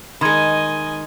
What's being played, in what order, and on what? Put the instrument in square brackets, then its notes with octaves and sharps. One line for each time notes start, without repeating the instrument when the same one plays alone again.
[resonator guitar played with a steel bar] D#3 G#3 [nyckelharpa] D#5 G#5 [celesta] B5 C6 G#6